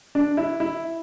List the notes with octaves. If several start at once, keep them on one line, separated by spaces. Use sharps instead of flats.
D4
E4
E4